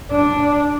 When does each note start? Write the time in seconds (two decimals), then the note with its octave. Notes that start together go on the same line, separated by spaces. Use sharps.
0.11 D4